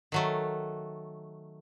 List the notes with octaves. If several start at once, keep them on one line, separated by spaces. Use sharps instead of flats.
D#3 F#3 A3